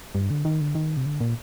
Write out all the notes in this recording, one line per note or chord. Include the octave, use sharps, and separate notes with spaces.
G2
D3
D#3
D3
D#3
C3
D3
A#2